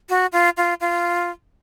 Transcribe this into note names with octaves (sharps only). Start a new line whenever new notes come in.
F#4
F4
F4
F4